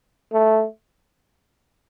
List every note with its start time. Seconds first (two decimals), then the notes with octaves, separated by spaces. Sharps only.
0.33 A3